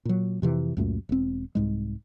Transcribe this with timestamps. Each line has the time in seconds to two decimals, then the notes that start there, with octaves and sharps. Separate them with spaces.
0.05 A#2 F#3
0.42 F2 C3 E3
0.77 C#2 F#2 A#2 A3
1.09 E1 C4
1.55 C2 G#2 G#3